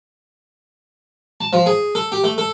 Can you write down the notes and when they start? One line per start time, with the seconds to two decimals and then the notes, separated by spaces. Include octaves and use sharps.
1.41 A5
1.53 F3
1.66 G#4
1.95 A4
2.12 G4
2.24 A3
2.38 A4